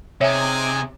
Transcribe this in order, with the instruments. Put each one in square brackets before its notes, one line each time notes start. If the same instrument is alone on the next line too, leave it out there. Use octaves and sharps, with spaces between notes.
[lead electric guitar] C3 [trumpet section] D#4 G#4 G#5 [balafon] C#5 E5